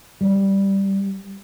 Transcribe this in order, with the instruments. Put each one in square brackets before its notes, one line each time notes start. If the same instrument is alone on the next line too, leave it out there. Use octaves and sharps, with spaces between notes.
[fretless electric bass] G3